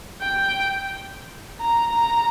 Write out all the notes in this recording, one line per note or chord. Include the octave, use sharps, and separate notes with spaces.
G5
A#5
A#5